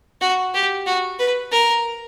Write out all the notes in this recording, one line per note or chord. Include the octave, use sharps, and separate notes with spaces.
F#4
G4
F#4
B4
A#4